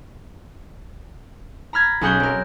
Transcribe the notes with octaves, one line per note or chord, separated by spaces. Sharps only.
A#5 B5 F6 G#6
B1 C#4 F#4 G#4 C#6 G6
C4 A#4